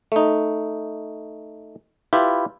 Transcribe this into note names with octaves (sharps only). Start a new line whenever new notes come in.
A3 D#4
E4 F4 G4 B4